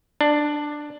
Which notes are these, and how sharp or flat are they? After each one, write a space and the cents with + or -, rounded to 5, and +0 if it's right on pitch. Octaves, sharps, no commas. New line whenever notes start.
D4 +10